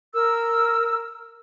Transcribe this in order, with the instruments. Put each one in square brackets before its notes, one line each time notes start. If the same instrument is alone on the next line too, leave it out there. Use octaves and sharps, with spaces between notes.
[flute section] A#4 E6